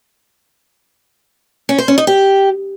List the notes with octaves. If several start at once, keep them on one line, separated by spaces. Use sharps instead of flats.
C#4
C5
C#4
D#4
G4